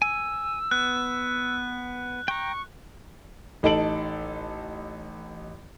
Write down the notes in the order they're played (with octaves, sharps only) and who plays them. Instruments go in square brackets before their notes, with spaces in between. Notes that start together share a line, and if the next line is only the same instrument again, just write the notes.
[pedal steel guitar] G#5 [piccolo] E6
[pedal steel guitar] B3 [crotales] F#6
[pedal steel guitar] G5 A#5 [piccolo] C#6
[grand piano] A1 D#4 A4 A5 D7 F#7